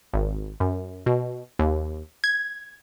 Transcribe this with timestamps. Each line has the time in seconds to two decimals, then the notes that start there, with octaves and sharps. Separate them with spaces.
0.13 G#1
0.60 F#2
1.06 B2
1.59 D#2
2.24 G#6